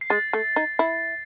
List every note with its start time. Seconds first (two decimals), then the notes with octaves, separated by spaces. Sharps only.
0.01 C7
0.10 G#3 A6
0.33 A3
0.56 D#4
0.79 E4